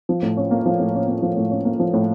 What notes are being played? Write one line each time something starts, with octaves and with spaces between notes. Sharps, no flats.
F3
A2
C#4
A#3
F3
A2
C#4
A#3
F3
A2
C#4
A#3
F3
A2